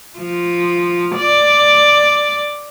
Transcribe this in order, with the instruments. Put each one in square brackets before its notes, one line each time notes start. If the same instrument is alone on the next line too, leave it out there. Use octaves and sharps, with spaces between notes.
[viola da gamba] F3
D5